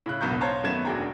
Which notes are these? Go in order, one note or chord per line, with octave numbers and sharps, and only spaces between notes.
A2 C#3 F#6
E1 B1 B3 A#5 C#6 G6
C5 C#5 F5 A5 A#5 C6
F#2 D#3 A3 B3 G#6 E7
E1 D4 F#4 G#4 G5 A#5